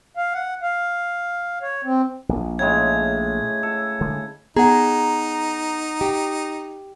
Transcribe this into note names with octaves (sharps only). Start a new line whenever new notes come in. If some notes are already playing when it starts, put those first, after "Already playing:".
F5
F#5
F5
C#5
C4
A#1
A2 C#3 G#3 G#6
A4
D3 G#3
B3 D#4 G#4 F#5 A#5
G4